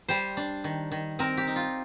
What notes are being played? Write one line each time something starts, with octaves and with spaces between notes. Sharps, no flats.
G3 C5
D4
D#3
D#3
C4 A#4
G4
D#4
F4